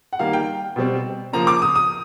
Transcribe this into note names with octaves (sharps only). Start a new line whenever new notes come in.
F#5
D#3 G3 A#3 F5
G5
B2 G3 C4
C#3 F3 A#3 A#5
D6
D#6
D#6